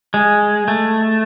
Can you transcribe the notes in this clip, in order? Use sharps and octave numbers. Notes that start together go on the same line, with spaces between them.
G#3
A3